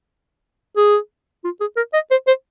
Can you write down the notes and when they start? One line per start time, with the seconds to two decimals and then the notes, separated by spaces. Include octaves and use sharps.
0.77 G#4
1.44 F4
1.60 G#4
1.77 A#4
1.94 D#5
2.11 C5
2.27 C5